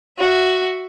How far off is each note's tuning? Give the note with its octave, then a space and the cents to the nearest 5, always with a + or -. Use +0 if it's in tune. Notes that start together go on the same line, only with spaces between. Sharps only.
F#4 +0 E5 +0